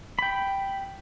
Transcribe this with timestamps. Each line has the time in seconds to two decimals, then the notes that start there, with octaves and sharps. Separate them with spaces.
0.19 G5 B5